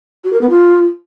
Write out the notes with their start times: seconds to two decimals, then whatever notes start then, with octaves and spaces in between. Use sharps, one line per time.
0.24 F#4
0.33 A#4
0.41 B3
0.50 F4